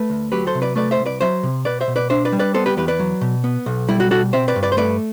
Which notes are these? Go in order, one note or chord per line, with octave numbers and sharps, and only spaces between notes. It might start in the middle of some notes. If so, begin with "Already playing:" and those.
Already playing: A3 B4
D2
F#3 G4 B4
A4 C5
C3
B4 D5
A3 B4 D5
C5 E5
C2
B4 D5
F#3 C5 E5
C3
B2 B4 D5
C5 E5
B2
B4 D5
D4 C5 E5
B4 D5
G3
B4 D5
B3 A4 C5
G4 B4
E2 G4 B4
B4 D5
F#3
B2
B3
B1
G3 E4
F#4
B2 F#4 A4
C4 C5 E5
B4 D5
G2
B4 D5
C5
A3 B4 D5